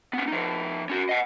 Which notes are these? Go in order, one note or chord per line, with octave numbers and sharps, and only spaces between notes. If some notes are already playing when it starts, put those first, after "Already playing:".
B3 C#4
F3 D#4
C#4 F#4
D#5 F#5